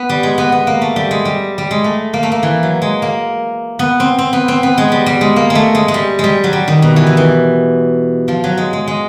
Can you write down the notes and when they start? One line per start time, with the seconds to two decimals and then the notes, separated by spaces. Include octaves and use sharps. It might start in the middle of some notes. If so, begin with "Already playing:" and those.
Already playing: B3
0.09 G3
0.23 G#3
0.38 B3
0.52 B3
0.67 A#3
0.81 A3
0.96 G3
1.11 G#3
1.25 G3
1.58 G3
1.71 G#3
1.84 A3
2.14 A#3
2.23 A3
2.32 A#3
2.43 E3
2.63 F#3
2.82 G#3
3.02 A#3
3.79 B3
4.00 C4
4.18 C4
4.33 B3
4.48 C4
4.63 B3
4.78 G#3
4.92 G3
5.06 G3
5.21 G#3
5.36 A#3
5.50 G#3
5.55 A3
5.75 G#3
5.88 G#3
5.94 G3
6.19 G#3
6.24 G3
6.44 F#3
6.53 G3
6.68 D#3
6.82 B2
6.96 E3
7.07 D#3
7.17 E3
8.28 F3
8.44 F#3
8.58 G#3
8.73 G#3
8.88 G#3